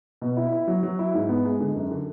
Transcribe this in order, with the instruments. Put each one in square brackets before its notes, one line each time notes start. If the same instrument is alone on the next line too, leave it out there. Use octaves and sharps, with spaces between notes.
[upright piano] B2
E4
E4
F#3
F#3
E4
G#2
B3
G#3
D3
F#2
D3